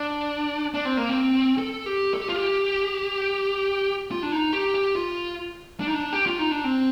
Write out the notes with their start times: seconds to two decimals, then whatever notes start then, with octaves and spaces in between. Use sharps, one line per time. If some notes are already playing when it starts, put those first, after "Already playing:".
Already playing: D4
0.74 D4
0.85 C4
0.97 A#3
1.09 C4
1.58 A4
1.86 G4
2.14 A4
2.21 G4
2.29 F4
2.36 G4
4.11 F4
4.23 D4
4.32 D#4
4.53 G4
4.75 G4
4.95 F4
5.80 D4
5.87 D#4
5.94 D4
6.13 G4
6.26 F4
6.39 D#4
6.51 D4
6.64 C4